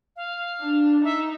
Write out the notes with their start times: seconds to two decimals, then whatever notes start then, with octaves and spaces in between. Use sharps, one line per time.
0.16 F5
0.61 D4
1.04 D#4 E5